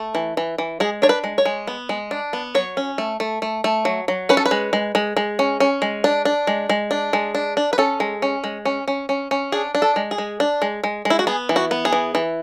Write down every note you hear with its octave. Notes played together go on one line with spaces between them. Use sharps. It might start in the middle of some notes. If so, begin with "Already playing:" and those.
Already playing: A3
E3
E3
E3
G#3 G#4
D4 C#5
B4
G#3
C#5
G#3
B3
G#3
D4
B3
F#3 C#5
C#4
A3
A3
A3
A3
F#3
F#3
C#4 B4
A4
B4
G#3
G#3
G#3
G#3
C#4
C#4
G#3
D4
D4
G#3
G#3
D4
G#3
D4
D4
B4
C#4 A4
G#3
C#4
G#3
C#4
C#4
C#4
C#4
D4 G#4
D4
A4
G#3
G#4
G#3
D4
G#3
G#3
G#3
E4
F#4
B3 G#4
E3
F#4
B3
G#4
E3
E3